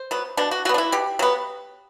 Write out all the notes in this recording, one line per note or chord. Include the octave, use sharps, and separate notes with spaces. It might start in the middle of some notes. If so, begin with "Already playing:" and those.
Already playing: C5
F#3 B3
B2 D4
F#4
F#3 B3 D4 F#4
E4
B2 G4
F#3 B3